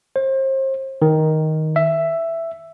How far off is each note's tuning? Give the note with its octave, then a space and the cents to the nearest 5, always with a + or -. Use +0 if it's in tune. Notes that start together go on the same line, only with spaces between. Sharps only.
C5 +35
D#3 +10
E5 +5